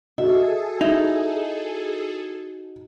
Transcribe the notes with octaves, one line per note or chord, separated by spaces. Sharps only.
F#4 G#4 A4 D#5 E5
D#4 E4